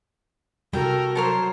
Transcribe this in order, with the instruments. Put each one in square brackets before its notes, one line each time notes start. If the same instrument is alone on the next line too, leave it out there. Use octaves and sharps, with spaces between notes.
[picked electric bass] C3 G3 [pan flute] F#4 [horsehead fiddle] A4 A#4 [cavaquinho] G5
[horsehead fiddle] F#3 C5 [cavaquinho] A4 A#4 C#5